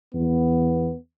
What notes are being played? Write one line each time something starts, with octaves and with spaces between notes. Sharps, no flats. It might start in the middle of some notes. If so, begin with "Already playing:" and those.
E2 B3